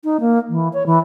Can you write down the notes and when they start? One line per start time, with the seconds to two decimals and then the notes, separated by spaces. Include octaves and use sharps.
0.04 D#4
0.20 A#3
0.49 E3
0.73 C#5
0.86 E3